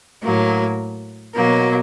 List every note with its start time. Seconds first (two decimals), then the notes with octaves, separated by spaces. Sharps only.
0.24 A2 F#3 A#3
1.35 B2 F#3 A#3